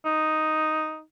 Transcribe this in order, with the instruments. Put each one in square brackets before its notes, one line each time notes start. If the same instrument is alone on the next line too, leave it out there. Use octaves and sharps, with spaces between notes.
[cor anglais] D#4